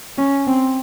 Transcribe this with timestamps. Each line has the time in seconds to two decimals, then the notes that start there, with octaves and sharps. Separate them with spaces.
0.18 C#4
0.47 C4